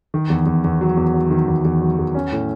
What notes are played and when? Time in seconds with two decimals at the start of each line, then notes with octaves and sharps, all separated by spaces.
0.14 D#3
0.30 E2
0.46 E2
0.64 E2
0.81 F#3
0.97 E2
1.14 F#3
1.30 D#3
1.48 E2
1.65 E2
1.82 F#3
1.98 E2
2.15 C#4
2.32 A2